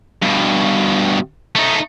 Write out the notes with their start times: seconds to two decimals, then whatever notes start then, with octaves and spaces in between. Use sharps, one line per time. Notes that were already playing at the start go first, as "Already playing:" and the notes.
0.22 G2 B2
1.55 A3 D#4